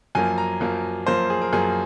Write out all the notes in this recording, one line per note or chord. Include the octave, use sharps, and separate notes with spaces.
F#2 F3 A#3 G#5
A#5
F#2 F3 A#3
F#2 F3 A#3 C5
G#4
A#4
F#2 F3 A#3 G#4